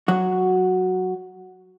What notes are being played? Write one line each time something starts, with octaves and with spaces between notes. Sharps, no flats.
F#3 F#4